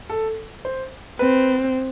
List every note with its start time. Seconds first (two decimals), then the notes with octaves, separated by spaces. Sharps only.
0.10 A4
0.65 C5
1.19 C4 B4